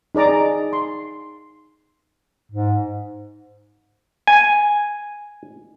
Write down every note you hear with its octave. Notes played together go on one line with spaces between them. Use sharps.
D#4 G#4 D5 A#5 D6
C6
G#2
G#5